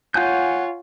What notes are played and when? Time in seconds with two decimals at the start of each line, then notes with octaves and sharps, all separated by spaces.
0.14 F4 C#5 F#5 G#5 G6